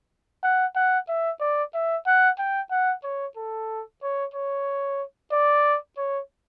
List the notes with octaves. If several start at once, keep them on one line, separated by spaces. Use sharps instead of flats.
F#5
F#5
E5
D5
E5
F#5
G5
F#5
C#5
A4
C#5
C#5
D5
C#5